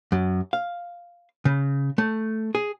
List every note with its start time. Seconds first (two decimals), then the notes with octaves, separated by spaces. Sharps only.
0.12 F#2
0.53 F5
1.45 C#3
1.98 A3
2.55 G#4